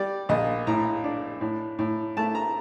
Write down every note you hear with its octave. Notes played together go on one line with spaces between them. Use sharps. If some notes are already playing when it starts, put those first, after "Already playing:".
Already playing: G3 D5
A#1 D#5
A2 A#5
D4
A2
A2
A3 A5
A#5